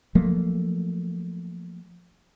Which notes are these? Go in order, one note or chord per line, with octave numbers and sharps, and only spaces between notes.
F3 F#3 A3 A#3